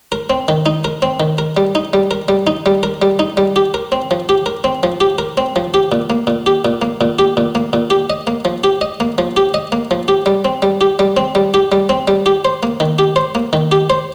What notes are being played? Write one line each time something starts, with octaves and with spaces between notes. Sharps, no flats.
A#4
C4
D#3
D#4
A#4
C4
D#3
A#4
G3
D#4
G3
A#4
G3
D#4
G3
A#4
G3
D#4
G3
G4
A#4
C4
F3
G4
A#4
C4
F3
G4
A#4
C4
F3
G4
A#2
A#3
A#2
G4
A#2
A#3
A#2
G4
A#2
A#3
A#2
G4
D#5
A#3
F3
G4
D#5
A#3
F3
G4
D#5
A#3
F3
G4
G3
C4
G3
G4
G3
C4
G3
G4
G3
C4
G3
G4
C5
A#3
D#3
G4
C5
A#3
D#3
G4
C5